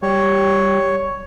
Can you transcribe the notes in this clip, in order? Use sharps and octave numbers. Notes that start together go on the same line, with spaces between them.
G3 C#5